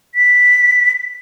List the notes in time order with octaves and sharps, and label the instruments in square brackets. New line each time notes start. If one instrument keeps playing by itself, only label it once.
[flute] B6